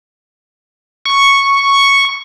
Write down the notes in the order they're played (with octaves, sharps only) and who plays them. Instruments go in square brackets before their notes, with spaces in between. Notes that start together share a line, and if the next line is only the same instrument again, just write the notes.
[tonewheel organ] C#6